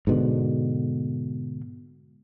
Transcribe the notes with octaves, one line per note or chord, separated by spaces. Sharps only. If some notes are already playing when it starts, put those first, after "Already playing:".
G#2 B2 D3